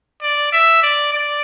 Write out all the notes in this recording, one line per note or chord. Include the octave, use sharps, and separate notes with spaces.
D5
E5
D5
D5